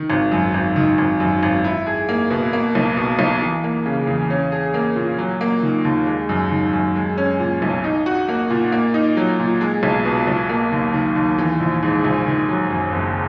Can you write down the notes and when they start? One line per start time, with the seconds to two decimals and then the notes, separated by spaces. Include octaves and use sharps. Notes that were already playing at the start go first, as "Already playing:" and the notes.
Already playing: D#3
0.10 G#1
0.32 F#2
0.54 G#1
0.76 D#3
0.98 G#1
1.20 F#2
1.43 G#1
1.64 E4
1.87 G#4
2.09 A#3
2.31 B2
2.53 A#3
2.75 B1
2.97 B2
3.19 B1
3.42 E3
3.64 A#3
3.86 C#3
4.07 E2
4.30 C#4
4.52 G#4
4.74 A#3
4.96 A#2
5.18 F#3
5.41 A#3
5.63 D#3
5.85 D#2
6.07 G#3
6.29 F#2
6.51 D#3
6.73 F#2
6.96 G#3
7.18 C#4
7.39 A#2
7.62 B1
7.84 D#4
8.06 F#4
8.28 A#3
8.50 A#2
8.72 A#3
8.94 D#4
9.17 F#3
9.39 A#2
9.61 G#3
9.83 B1
10.05 B2
10.27 B1
10.49 A#3
10.72 D#2
10.94 D#3
11.16 D#2
11.38 E3
11.60 A#1
11.83 G#2
12.04 A#1
12.26 D#3
12.48 F#3
12.70 F#2
12.92 F#1